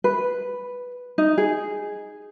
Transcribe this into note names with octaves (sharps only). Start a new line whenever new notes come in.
B4
D#4
G#4